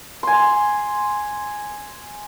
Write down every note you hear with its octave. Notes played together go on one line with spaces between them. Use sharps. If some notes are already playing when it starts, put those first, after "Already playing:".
G#5 C6